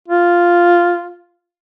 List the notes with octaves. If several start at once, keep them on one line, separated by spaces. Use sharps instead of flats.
F4